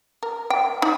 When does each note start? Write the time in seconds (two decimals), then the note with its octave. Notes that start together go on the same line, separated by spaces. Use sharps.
0.23 A#4
0.50 G5
0.82 D#4